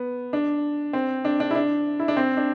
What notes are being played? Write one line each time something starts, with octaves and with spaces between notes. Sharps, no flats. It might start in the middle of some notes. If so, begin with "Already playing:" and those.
Already playing: B3
D4
C4
D4
D4
E4
D4
E4
D4
C4
D4